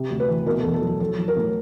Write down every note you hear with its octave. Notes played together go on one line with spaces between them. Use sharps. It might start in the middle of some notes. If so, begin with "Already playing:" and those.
Already playing: C3
D2
B4
E3
B2 A#4
A4
E2
A4
F#3
A4
F#3 A4
F#3
A#4
A2